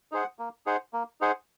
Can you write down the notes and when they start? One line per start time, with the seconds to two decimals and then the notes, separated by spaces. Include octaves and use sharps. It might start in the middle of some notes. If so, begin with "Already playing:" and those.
0.12 D#4 G#4 C5 F#5
0.39 A#3
0.66 D#4 G#4 C5 F#5
0.93 A#3
1.21 D#4 G#4 C5 F#5